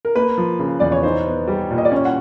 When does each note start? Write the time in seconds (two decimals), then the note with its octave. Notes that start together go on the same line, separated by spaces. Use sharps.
0.05 A#4
0.16 A#3 B4
0.38 F3
0.59 C#3
0.80 E2 D5
0.92 C#5
1.03 D#4 C5
1.26 B3
1.48 G3
1.71 A#2
1.78 D#5
1.85 D5
1.92 C#4 C#5
2.05 F#5